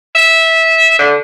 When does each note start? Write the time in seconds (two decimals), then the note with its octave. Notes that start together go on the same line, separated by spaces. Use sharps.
0.15 E5
0.99 D3